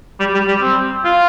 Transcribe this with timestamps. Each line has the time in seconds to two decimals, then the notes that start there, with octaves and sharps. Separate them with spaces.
0.20 G3
0.34 G3
0.48 G3
0.62 C4
1.04 F4